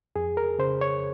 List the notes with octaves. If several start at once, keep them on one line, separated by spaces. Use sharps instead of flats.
F2 G#4
A#4
C#3 C5
C#5